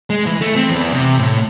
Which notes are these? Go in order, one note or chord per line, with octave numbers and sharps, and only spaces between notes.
G#3
E3
A3
C4
E2
C3
A2